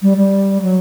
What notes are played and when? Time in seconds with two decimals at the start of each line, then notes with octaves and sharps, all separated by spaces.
0.02 G3
0.17 G3
0.62 F#3